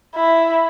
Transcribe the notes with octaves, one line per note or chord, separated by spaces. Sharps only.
E4